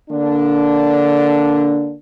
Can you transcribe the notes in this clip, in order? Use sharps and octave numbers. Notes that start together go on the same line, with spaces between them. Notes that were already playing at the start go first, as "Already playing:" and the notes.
D3 A#3 D4